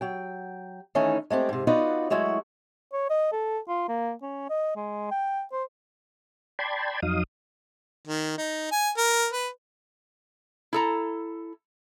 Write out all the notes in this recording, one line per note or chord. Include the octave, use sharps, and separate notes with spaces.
F#3 G5
D#3 E3 A3 C#4 D#4
G#3 A3 C4 G4
G#2 C3
B3 D#4 F4 F#4 B4 D5
F#3 G#3 A3 E4 F#4
C#5
D#5
A4
F4
A#3
C#4
D#5
G#3
G5
C5
D5 G5 A5 B5 C6 G#6
F2 F#3 D#4 F5 D#6
D#3
D#4
G#5
A#4
B4
E4 A4 A#5